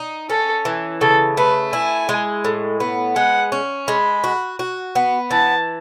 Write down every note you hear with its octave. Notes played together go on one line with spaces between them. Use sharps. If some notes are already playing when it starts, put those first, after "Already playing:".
Already playing: D#4
C#4 A4
E3
C#3 A4
A3 B4
E4 G#5
G#3
A2
B3
G#3 F#5
C#4
G#3 B5
F#4
F#4
B3
E3 A5